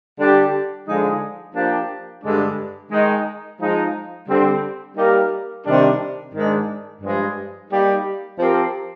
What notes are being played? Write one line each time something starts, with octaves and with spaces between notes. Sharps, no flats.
D3 G3 D4 G4
D3 F3 G#3 D#4 G#4
F3 A#3 D4 G4
G2 D3 G#3 D4
D#3 G#3 D#4
F3 G#3 D#4
D3 G3 C4
G3 A#3 D#4 G4 A#4
C3 D#3 G3 D4
G#2 D#3 G#3 D4
G2 F3 G#3
G3 A#3 D#4 G4
F3 C4 G4 A#4